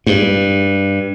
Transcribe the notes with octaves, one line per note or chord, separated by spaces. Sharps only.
G2